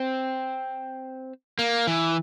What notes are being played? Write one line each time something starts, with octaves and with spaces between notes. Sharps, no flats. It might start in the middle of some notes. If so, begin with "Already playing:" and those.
Already playing: C4
A#3
E3